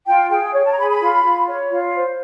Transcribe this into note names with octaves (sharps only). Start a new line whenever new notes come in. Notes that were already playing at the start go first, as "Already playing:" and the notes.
F4 G5
G#4 G5
C#5
A5
A#5
G#4 B5
B5
F4
F4
C#5
F4
C5